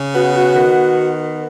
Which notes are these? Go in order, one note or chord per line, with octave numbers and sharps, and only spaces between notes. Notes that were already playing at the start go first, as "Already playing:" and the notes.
Already playing: C#3
B3 F#4
F#4
D#3
B3